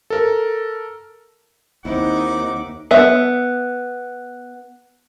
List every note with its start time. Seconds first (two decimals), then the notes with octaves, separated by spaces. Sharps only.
0.10 A4 A#4
1.85 D#2 D#3 C4 D#4 E4 E5 F#5 D6
2.91 B3 E5